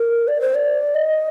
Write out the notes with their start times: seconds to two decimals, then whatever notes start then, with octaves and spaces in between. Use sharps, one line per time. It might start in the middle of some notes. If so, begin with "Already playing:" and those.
Already playing: A#4
0.28 D5
0.41 C5
0.55 D5
0.95 D#5